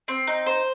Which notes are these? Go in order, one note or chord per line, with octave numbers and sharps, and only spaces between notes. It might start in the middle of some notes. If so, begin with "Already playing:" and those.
C4
D#4
C5